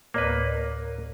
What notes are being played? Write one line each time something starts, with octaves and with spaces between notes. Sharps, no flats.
D2 A2 A#3 B4 C#5
A#4